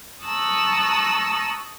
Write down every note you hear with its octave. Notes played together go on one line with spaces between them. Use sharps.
A5 A#5 C#6 D#6 E6 F#6